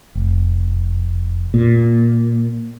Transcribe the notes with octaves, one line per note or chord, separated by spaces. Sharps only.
F1
A#2